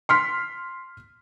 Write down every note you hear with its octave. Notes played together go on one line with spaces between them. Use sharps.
C6 F6 B6